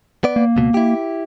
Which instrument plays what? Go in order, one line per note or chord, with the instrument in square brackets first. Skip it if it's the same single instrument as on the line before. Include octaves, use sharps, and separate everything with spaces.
[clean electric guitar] B3 D5
[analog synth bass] A#3
[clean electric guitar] C#2 B2
E4 G4